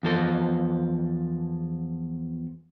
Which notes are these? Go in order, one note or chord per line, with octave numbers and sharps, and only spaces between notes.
E2 F3 A4